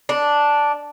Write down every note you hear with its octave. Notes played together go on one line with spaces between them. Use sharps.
D4